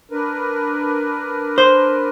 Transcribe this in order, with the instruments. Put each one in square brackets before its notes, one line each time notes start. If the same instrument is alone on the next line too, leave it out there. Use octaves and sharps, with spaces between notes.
[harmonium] D4 A#4 B4
[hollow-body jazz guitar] C5